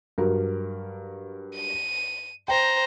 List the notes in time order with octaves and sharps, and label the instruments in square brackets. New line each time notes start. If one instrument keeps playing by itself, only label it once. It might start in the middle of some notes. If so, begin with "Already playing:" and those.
[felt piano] G2 F#3 A#4
[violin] D#7
[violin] C5 A#5 [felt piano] G5